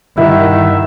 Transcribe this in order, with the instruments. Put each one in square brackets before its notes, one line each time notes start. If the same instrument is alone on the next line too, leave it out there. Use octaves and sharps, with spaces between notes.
[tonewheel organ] G2 G3 F#5 [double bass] D#3 [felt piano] E4 [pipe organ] E5